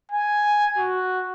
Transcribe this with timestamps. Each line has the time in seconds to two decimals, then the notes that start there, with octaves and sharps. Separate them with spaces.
0.12 G#5
0.78 F#4